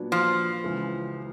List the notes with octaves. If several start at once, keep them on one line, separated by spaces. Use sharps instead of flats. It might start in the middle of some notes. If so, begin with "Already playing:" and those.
Already playing: A#2 F#3 B3 D4
F3
C#2 C#3 E3